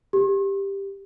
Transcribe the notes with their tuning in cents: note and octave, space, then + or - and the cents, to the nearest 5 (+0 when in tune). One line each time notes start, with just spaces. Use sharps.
G4 +10